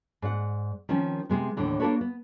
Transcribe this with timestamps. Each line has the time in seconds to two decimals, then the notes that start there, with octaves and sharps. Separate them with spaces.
0.22 G#2 D5 F#5
0.89 D#3 F3 C4 C#4
1.29 C3 G#3 B3
1.57 D#2 A2 D3 E3
1.80 A#3 D4 F4 A4 B4 C#5
2.01 B3